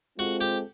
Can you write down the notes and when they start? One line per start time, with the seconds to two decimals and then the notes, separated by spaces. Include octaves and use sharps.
0.18 G#3 C4 F4 F#4 A4 C5
0.41 G4